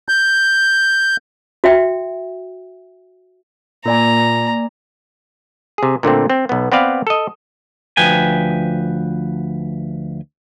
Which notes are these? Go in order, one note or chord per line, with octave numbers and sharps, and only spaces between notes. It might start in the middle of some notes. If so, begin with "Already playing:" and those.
G6
F#4 E5 G5
A#2 A#3 D5 G#5 A#5
C3 G#4
A#2 D3 A3 C4
C4
B1 B3
B3 C4 B4 D5 F5
A4 D#5
D2 F3 B4 G5 G#5